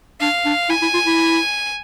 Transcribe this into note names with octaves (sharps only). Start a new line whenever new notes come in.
D4 F5
D4
E4 G#5
E4
F4
E4